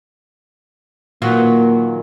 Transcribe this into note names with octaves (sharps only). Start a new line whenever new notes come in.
A#2 D#3 F#3 A#3 F4 F#4 B4